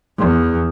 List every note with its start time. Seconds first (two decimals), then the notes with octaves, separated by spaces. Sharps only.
0.18 E2